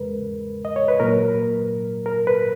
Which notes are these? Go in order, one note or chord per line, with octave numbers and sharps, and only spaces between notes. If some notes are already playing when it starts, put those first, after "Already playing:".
Already playing: E2 C#3 G#3 A#4 B4
D#5
C#5
B4
A#2 F#3 A#4
A#4
B4